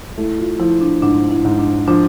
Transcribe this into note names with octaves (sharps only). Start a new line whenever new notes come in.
A3 E4
F4
F3 E4
D4
G#2 D4
E4
G#2
D4
F3 D4